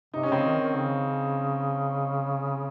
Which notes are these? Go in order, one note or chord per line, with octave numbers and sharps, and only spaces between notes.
C3 D#4
C#4
C#3 C4 D#4
D#3
D#3
C#3